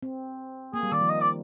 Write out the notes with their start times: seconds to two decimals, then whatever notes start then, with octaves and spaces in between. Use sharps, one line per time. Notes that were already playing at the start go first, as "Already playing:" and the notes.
0.03 C4
0.74 A#3 G#4
0.83 G3
0.92 D#3 D5
1.01 F3
1.09 D#5
1.21 D5